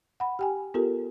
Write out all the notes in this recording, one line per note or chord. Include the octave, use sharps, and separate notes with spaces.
F#5 B5
G4 G5 G#5
B3 F4 G4 A4 A#4